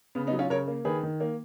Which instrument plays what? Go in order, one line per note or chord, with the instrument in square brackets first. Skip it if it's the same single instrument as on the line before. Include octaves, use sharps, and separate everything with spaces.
[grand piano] C#3 B3
B3 D#4
F#3
C#4 F4
C#3 A#4 C#5
A#3
D#3 G#4 B4
D#3
A#3